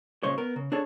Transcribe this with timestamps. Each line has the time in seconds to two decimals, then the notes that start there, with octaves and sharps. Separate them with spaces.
0.23 A#2 C#3 G#3 C5 C#5
0.38 B3 A#4
0.56 C#3
0.72 D4 G#4 A4 C#5 A5